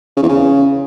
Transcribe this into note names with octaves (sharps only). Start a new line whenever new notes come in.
C#3
E2
C#3